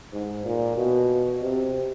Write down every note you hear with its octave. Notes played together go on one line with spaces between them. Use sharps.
G#2
A#2
B2
C3